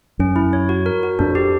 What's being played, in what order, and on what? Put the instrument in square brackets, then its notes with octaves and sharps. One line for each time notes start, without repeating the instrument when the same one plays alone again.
[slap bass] F#2 [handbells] C#4
[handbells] E4
C#5
F#4
A#4
F#4
[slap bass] F2 [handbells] D4
[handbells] G4